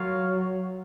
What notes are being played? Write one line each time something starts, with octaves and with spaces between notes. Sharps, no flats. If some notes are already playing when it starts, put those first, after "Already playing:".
Already playing: F#3 F4 A#4 C#5 F5